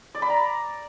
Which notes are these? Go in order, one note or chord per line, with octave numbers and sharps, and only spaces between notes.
D5
B5
A#5